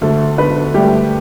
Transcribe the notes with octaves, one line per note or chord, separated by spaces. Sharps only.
D2 A3 A4
D3 B3 B4
G3 A3 G4